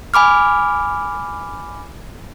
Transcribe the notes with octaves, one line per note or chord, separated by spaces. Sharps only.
G#5 B5 D6 F6